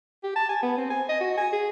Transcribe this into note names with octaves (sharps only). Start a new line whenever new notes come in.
G4
A5
G#5
B3
C4
G#5
D#5
F#4
G#5
G#4